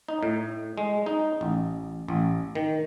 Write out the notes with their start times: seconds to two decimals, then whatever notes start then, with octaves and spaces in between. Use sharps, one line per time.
0.08 D#4
0.23 A2
0.78 G#3
1.06 D#4
1.41 A1
2.08 A1
2.55 D#3